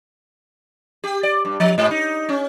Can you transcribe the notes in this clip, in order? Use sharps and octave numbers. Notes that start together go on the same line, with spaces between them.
G4
D5
G2
F3
G#2
D#4
C#4